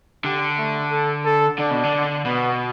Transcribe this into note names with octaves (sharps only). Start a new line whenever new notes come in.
D3 G4
A3
A4
A4
D3 D4
B2
D3
B2 B3